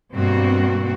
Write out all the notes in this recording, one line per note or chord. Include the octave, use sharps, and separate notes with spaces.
G2 B2 A#3 C4 F#4